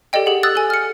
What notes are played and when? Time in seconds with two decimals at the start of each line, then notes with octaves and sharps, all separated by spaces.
0.13 G4 A4 D5 D#5 G5
0.26 G4 G#4 F#5
0.43 D#6 E6 F#6 A6
0.55 A4 G#5
0.70 F6 C#7